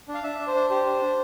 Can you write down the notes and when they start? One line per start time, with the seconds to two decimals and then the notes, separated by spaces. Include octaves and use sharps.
0.08 D4
0.14 F5
0.24 D4 E5
0.39 D4
0.48 C5
0.55 D4
0.70 G4 C5
0.86 D4
1.02 D4